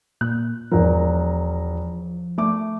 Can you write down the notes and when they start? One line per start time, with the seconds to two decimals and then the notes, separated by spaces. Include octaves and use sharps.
0.21 A#2 F#6
0.72 E1 F3 A#4
2.38 A3 D6